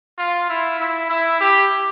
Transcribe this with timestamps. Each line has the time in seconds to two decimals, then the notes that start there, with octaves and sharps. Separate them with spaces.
0.18 F4
0.49 E4
0.80 E4
1.10 E4
1.40 G4